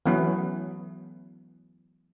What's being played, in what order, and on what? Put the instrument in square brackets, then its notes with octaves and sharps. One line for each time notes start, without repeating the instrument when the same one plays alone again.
[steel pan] E3 F#3 A3 B3 C#4 B4